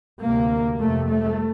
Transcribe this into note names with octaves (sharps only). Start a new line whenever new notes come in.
D2 C3 A#3
F2 C3 A3
A3